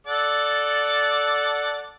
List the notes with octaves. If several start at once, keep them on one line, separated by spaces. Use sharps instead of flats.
A4 D5 F#5